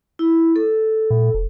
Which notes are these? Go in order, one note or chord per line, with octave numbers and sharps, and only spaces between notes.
E4
A4
A#2
E1